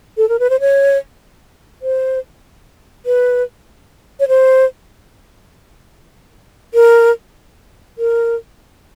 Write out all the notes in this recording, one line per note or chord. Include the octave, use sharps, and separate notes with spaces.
A4
A#4
B4
C5
C#5
C5
B4
C#5
C5
A#4
A#4